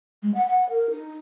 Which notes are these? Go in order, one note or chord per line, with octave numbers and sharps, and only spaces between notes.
G#3
F#5
F#5
A#4
D#4